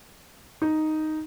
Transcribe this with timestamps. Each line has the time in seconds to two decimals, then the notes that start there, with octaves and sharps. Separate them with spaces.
0.62 D#4